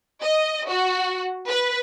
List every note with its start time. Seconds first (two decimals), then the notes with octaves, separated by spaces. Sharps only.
0.23 D#5
0.68 F#4
1.48 B4